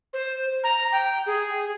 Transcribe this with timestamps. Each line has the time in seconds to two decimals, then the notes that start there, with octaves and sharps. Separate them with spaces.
0.13 C5
0.64 A#5
0.92 G5
1.26 G#4